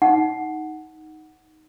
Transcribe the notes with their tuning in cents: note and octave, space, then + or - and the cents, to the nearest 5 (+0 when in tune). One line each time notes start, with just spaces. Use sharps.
D#4 +0 F#5 +0